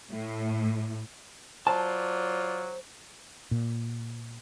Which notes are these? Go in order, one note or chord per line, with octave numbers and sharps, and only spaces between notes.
A2
F#3 F4 C5 D5 A5
A#2